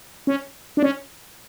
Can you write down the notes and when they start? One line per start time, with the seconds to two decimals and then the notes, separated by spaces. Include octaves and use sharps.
0.27 C#4
0.77 D4
0.82 C#4